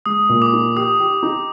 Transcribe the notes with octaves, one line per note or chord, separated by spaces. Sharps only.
G#3 D#6
A#2
D6
D#4
G4 D#6
G4
D#4